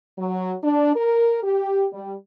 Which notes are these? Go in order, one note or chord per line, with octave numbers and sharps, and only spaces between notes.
F#3
D4
A#4
G4
G3